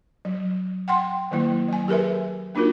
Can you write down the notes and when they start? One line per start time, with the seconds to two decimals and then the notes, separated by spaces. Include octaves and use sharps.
0.25 F#3
0.88 F#5 G5 C6
1.31 D#3 F#3 A#3 E4
1.68 F#3 G#5
1.88 G4 G#4 A#4 B4 E5
2.55 A#3 D4 D#4 F4 F#4 A#4